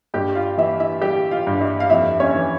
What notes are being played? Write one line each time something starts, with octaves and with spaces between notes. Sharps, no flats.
G2 G4 G5
F4 F5
E3 E4 E5
E4 E5
G3 G4 G5
F4 F5
G2
E4 E5
F5
F2 E4 E5
C#4 C#5
E3